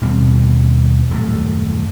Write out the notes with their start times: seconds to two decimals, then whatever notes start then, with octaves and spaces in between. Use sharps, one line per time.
0.01 D#2 B2 G3 C4
1.10 D#1 F#2 A2 A3